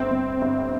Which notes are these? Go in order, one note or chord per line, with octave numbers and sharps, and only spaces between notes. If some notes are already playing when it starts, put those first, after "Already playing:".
Already playing: G1 C4
G1
G1